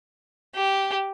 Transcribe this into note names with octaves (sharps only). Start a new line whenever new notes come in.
G4